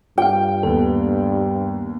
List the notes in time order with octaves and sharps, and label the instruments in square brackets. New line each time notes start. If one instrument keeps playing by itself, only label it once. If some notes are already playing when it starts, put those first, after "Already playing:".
[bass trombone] G2 [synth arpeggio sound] F4 F5 [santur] G5
[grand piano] D#2 B3 [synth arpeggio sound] A4